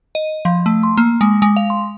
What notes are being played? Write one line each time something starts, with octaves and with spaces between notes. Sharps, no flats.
D#5
F3
A3
C6
A#3
G#3
G#3
F5
C6